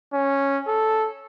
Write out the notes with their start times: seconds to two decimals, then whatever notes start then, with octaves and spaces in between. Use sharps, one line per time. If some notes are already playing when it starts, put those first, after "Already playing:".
0.13 C#4
0.67 A4